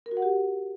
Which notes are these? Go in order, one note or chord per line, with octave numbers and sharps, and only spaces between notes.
A#4
F#4
F#5
G4